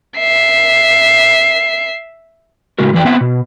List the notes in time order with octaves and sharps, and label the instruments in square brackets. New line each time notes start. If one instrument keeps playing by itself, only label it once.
[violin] E5 C7
[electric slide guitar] A2 C#3 G#3 F#4 A#4
F2 E3 F#3 D5 G5
B3 C4 C5 E5 F#5
B2